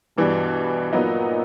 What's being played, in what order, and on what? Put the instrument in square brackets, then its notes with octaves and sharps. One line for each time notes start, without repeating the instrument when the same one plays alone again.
[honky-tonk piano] G2 E3 G3 [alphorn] B2
[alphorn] A#2 [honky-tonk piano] F#3 B3 D#4